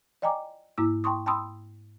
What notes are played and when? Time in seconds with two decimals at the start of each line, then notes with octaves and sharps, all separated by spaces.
0.22 D5 D#5 G5 G#5 A#5 D6
0.78 G#2 A#3 E4 E6
1.04 G5 A5 C6 C#6 D#6
1.26 G5 A5 B5 C6 D#6 E6